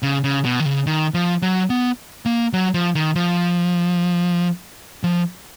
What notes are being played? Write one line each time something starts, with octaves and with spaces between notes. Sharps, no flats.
C#3
C#3
B2
D#3
C#3
D#3
F3
F#3
B3
A#3
F#3
F3
D#3
F3
F3